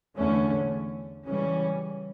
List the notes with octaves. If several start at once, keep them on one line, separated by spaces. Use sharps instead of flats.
E2 D3 A3 C#4
C#3 E3 G3 C#4